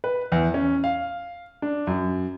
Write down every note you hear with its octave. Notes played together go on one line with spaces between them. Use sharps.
B4
E2
C#4
F5
D4
F#2